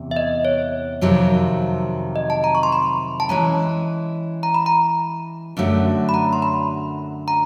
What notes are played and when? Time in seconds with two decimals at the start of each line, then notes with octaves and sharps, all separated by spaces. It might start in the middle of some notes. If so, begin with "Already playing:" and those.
Already playing: E2 C3
0.11 E5
0.16 D#5
0.45 C#5
1.01 F2 C3 D#3 F#3
2.16 D#5
2.30 A5
2.44 A#5
2.55 C#6
2.63 C6
2.72 B5
3.20 A5
3.29 E3 G#3 C#4 A#5
4.43 A#5
4.54 B5
4.66 A#5
5.57 F#2 D3 F#3 A3
6.09 B5
6.14 A#5
6.33 C6
6.42 B5
7.28 A#5